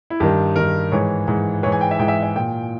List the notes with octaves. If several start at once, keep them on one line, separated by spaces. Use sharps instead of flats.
E4
G2 D#3 G4
G2 D#3 A#4
G#2 E3 C#5
G#2 E3
G#2 E3 C#5
G#5
G5
E5
G#2 E3 G5
E5
E5
A#2 G5